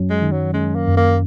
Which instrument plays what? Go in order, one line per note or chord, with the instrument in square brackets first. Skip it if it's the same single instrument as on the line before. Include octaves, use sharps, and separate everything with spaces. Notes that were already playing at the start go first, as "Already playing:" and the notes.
Already playing: [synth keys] F#2 F#3 C#4
[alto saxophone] G#3
[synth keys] D#3
[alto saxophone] F#3
[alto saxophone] G#3 [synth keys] C#4
[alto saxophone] A#3
[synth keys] F#2
[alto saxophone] A#3